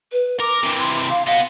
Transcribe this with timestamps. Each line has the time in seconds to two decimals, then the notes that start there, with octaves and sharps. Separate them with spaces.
0.12 B4
0.40 A#4 D6
0.63 C3 E3
0.79 C6
1.10 F5
1.27 B3 D#5 F5